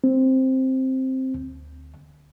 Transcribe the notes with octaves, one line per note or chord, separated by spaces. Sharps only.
C4
D2